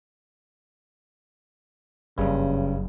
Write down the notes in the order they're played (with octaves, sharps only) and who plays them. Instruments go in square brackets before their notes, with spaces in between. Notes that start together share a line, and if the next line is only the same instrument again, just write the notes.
[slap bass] F#1 [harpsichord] G2 [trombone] C#3